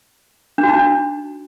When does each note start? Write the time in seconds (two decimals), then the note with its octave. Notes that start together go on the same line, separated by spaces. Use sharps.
0.58 D4
0.63 F#4
0.68 D#4
0.73 D4